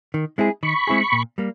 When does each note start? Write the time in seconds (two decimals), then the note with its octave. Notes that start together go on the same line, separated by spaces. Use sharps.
0.14 D#3
0.38 G#3 C4 E4 G#4
0.63 D#3 B5 C#6
0.87 G#3 C4 E4 G#4
1.12 A#2
1.38 G3 A#3